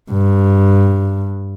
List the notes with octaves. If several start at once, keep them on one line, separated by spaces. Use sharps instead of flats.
G2